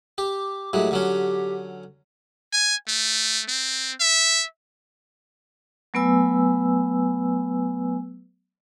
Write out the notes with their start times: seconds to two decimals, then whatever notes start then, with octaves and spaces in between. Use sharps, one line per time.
0.18 G4 D6
0.73 A2 F#3 G#3 G4
0.91 D3 F#3 C#4
2.53 G#5
2.88 A3
3.48 C4
4.00 E5
5.94 F#3 A3 B3 B4 G#5 E6